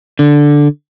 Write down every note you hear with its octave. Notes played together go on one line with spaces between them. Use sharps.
D3